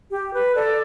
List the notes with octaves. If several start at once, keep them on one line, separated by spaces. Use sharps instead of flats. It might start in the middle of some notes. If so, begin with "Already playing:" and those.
G4
B4
A4 D5